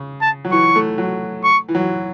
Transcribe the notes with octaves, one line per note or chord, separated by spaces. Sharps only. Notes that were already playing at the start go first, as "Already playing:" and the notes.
Already playing: C#3
A5
F#3
E3 C#6
A3
F#3
C#6
E3
F#3